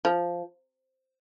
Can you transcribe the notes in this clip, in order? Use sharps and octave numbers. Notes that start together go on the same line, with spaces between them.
F3